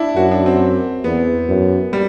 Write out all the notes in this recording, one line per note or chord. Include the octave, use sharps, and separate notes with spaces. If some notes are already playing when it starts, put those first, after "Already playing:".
Already playing: D4 E4
F#2 F#4
D4
C4
E2 B3
F#2
G3